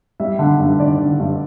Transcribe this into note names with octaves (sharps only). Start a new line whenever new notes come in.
G3 E5
D3
G2
D3 D5
D3
G2